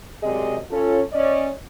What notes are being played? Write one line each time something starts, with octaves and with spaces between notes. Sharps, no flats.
F#2 C3 G#3 G#4 D5 D#5
C#4 F4 A4
C#4 D5 D#5